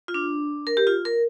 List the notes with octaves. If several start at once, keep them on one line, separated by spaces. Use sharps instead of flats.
F4
D4
A#4
G4
F4
A#4